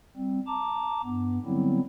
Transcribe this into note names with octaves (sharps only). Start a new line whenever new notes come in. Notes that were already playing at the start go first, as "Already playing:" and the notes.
G3 C4
A5 A#5 D6
G2 B3
D3 F#3 G3 B3 C4 E4